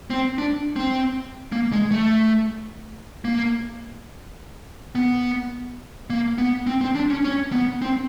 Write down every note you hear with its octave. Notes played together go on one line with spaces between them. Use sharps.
C4
D4
C4
A#3
G#3
A3
A#3
B3
A#3
B3
C4
C4
D4
C#4
C#4
B3
C4